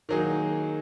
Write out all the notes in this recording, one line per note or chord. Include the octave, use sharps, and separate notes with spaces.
D#3 F#3 A#3 D#4 G#4